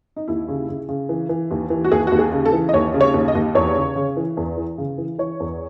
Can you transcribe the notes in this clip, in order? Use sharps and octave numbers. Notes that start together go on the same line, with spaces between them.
D#4
D#2 E4
C#3
C#3
C#3
E3
E3
D#2
E3
F#4
D#2 G#4
D#2 F#4
G#4
C#3
A4
E3
D#5
D#2 C#5
C#3
C#5
D#2
D#5
D#2
E2 C#5
C#3
C#3
E3
E2
E3
C#3
E3
E3 C#5
E2